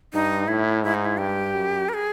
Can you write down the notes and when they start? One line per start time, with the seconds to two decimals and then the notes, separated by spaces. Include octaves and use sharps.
0.14 G2 D#4
0.48 A2 E4
0.83 G#2 E4
0.94 D#4
1.05 E4
1.18 G2 G4
1.54 F#2
1.89 A#4
1.94 G#4